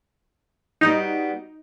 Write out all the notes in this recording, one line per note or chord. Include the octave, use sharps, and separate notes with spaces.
G3 B3 D#4 F#4